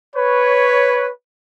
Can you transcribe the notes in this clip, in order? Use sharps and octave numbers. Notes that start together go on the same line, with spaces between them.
B4 C#5